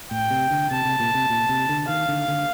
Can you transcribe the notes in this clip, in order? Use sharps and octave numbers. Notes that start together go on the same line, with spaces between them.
A2 G5
C3
D3
C3 A5
C3
A#2
C3
A#2
C3
D3
D#3 F5
D3
D3